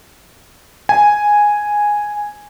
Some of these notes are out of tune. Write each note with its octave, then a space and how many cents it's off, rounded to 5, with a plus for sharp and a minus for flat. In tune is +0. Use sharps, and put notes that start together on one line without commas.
G#5 -5